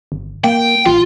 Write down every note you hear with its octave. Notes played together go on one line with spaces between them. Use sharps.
G1
A#3 G5
A1 F4